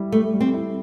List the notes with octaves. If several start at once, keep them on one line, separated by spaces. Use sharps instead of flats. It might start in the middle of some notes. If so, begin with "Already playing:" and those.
Already playing: G3 E4
G3 A3
G3
C4
E4